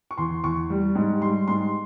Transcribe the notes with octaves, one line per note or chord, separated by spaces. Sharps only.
C#6
E2 C6
E2 C#6
G3
G#2
G3 C6
G#2 C6